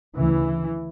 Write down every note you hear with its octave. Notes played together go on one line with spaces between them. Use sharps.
D2 C#3 E3